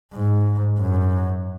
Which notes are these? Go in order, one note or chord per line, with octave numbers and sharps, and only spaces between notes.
G#2
F#2